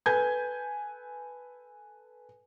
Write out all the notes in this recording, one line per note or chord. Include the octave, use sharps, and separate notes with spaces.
A4 B4 G#5 G6 G#6